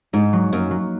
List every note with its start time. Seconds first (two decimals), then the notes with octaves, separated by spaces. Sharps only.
0.13 G#2 D#4
0.33 F#3
0.52 F#2 A#3
0.71 F#3